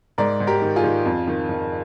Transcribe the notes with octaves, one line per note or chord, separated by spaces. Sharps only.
G#2 A#4 D5
G#2
G4 A#4
D#3
F4 G#4
D#3
F2
D#3
D#3